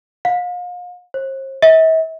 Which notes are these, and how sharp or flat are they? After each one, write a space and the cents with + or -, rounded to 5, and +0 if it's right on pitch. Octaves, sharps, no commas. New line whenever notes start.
F5 +40
C5 +40
E5 -40